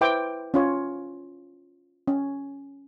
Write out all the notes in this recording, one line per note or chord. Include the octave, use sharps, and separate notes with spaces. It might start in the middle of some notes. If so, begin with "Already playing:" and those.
E4 B4 C5 E5 G5 D6
C#4 F4 C#5
C#4